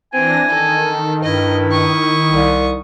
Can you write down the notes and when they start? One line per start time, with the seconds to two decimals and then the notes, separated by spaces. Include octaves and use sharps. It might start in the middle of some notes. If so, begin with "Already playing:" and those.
0.13 E3 C4 D4 G#5 A#6
0.49 D#3 A4
1.24 G2 E4 D#5
1.72 C#6 D#6
2.32 C2